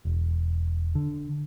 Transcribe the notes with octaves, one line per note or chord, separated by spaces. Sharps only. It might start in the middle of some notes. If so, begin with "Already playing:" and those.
E1
D3